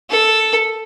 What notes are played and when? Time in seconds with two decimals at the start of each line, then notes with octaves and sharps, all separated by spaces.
0.10 A4